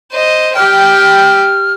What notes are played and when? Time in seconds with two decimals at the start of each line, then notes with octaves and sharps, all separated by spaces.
0.12 C5 D#5
0.56 G4 G5 F6